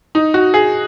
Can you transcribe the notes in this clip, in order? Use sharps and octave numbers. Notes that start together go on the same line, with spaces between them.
D#4
F#4
G#4